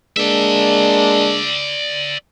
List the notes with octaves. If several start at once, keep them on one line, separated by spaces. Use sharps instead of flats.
G#3 A#3 D4 D5 E5